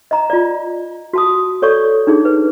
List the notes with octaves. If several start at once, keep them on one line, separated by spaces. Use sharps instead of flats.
D#5 A#5
F4 D5
F#4 A5 D#6
A4 C#5 D5 C#6
D4 D#4 G#4
B4